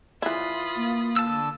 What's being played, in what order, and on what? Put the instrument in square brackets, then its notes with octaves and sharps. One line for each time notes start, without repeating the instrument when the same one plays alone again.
[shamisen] E3 E4 [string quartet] F4 B5 D#6
[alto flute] A#3
[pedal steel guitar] D3 A5 E6